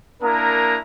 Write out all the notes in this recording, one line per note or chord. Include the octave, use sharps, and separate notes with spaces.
A#3 D4 E4 A#4 A#5 D#6